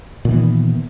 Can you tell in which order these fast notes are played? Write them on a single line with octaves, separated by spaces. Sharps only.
A#2 D#3 E3 B3